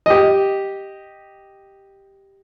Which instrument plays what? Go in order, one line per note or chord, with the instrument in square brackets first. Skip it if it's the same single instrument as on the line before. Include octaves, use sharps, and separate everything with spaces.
[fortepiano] G4 D#5